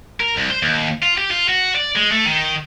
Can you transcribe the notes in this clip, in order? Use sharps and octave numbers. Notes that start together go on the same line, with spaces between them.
A#4
C2
C5
D#2
F4
G4
F4
F#4
D5
G#3
A3
D#3